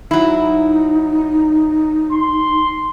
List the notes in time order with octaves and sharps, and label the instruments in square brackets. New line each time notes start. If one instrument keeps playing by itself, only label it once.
[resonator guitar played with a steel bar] F#3 E4 [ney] D#4
[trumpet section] C6